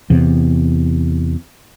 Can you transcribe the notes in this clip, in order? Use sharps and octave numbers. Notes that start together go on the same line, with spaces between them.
E2 C3